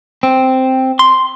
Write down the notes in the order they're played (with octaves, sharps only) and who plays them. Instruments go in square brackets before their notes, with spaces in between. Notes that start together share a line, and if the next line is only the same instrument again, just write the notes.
[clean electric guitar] C4
C6